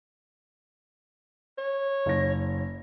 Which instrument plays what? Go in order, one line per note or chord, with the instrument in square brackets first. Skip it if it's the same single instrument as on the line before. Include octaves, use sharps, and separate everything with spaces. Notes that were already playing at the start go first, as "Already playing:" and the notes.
[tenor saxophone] C#5
[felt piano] F#1 A#6